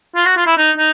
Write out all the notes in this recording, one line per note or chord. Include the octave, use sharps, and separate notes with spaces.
F4
F#4
F4
E4
D#4
D#4